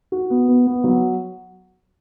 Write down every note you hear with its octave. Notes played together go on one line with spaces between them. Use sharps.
F#4
B3
B3
B3
F#3